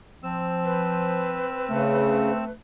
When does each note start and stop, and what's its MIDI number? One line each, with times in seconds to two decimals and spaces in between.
0.23 1.55 53
0.23 2.44 60
0.23 2.44 88
0.64 2.51 71
1.69 2.31 49
1.69 2.54 57